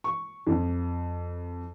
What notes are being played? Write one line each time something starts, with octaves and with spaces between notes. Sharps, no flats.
C#6
F2